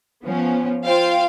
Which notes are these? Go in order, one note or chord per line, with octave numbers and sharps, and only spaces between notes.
F3 B3 C#4
F4 C5 F5 G5